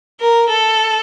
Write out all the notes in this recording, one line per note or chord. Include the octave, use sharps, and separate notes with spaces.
A#4
A4